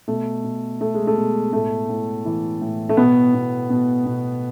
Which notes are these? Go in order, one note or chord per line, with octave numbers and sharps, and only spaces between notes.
B2 A3
B2
B2 A3
G#3
A3
B2
A2 A3
A2
E3
A2
A3
B2 B3
B2
B2
B2